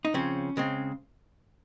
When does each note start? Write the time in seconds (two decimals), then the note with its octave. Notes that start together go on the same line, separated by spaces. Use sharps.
0.05 D#4
0.14 C#3 F3 C4 C#4
0.57 C#3 G#3 C4